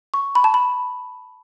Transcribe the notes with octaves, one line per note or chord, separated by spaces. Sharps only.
C#6
B5
A5
B5